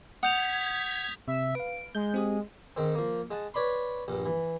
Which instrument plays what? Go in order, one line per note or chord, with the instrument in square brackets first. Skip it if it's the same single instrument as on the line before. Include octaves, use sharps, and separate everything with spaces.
[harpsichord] F#5 [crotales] D#6 G6 F7 [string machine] G#6 B6
[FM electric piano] C3 [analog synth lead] E5
[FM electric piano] B4 F5 [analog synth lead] D7
[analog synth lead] G#3 [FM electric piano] G6
[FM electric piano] C4 G4 D#6
[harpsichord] G#2 D#3 C4
F3 A#3
G#3 F#5 A5
B4 C#5 D5 B5 C6
A#1 G2
E3